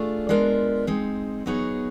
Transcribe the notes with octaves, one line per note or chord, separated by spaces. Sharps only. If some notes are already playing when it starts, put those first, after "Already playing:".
Already playing: A3 D4 F4 G#4
G#3 B3 D4 F4 A#4
G#3 C4 D#4
F#3 B3 D#4 G#4 C#5